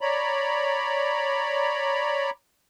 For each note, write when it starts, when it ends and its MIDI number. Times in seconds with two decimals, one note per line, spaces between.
0.01 2.30 73
0.01 2.30 74
0.01 2.30 82
0.01 2.30 83